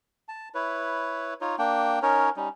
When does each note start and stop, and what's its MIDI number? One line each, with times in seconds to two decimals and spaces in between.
0.28 0.49 81
0.55 1.34 64
0.55 1.34 71
0.55 1.34 73
1.41 1.56 63
1.41 1.56 65
1.41 1.56 73
1.59 1.99 58
1.59 1.99 62
1.59 1.99 79
2.02 2.29 61
2.02 2.29 63
2.02 2.29 70
2.02 2.29 73
2.36 2.49 55
2.36 2.49 61
2.36 2.49 63